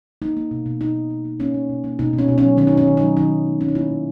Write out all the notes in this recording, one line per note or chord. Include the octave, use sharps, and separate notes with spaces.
A#3 D#4
A#3
B2
B2
A#3 D#4
A#3
A#3
A#3
A#3 C#4
A#3
B2
A#3
B2 D#4
B2
C#4
B2
C#4
F#3
D#3 C#4
D#4
D#3
C#4
D#3
F#3 D#4
D#3 D#4
F#3
B3
F#3 C#4
D#4
A#3 E4
A#2